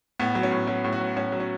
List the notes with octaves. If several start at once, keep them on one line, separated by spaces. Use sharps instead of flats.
A2 B3
F#3
C#4
A2
F#3 C#4
A2
F#4
F#3
A2 C#4
F#3
C#4